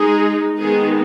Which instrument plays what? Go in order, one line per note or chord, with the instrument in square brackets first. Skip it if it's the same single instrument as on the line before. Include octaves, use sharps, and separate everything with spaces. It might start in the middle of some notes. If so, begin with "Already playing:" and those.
Already playing: [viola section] G#3 D#4 G#4
D#3 G#3 B3 D#4 G#4